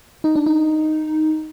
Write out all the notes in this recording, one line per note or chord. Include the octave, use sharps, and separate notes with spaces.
D#4
D4
D#4